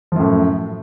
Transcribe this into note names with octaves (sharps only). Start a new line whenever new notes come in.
F#2 A2 F3